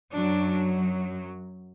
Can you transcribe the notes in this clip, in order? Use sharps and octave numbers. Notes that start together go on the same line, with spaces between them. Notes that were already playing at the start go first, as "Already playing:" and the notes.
F#2 F#3 D4